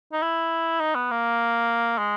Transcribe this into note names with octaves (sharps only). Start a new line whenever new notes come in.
D#4
E4
D#4
B3
A#3
G#3